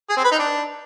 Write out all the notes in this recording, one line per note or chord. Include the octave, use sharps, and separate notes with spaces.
G#4
C4
B4
D#4
D4